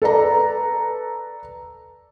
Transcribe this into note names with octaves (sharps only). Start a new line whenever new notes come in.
A4 B4 D5 A#5